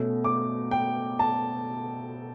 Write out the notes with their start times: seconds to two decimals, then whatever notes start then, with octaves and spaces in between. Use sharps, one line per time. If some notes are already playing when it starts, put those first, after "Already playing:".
Already playing: B2 A3 C#4
0.24 D6
0.71 G5
1.19 A5